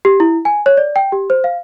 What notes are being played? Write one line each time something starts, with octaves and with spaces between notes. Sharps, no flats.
G4
E4
G#5
C#5
D5
G5
G4
C5
F5